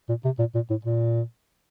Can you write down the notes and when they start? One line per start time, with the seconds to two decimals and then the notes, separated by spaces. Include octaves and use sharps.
0.09 A#2
0.25 C3
0.39 A#2
0.55 A#2
0.70 A2
0.85 A#2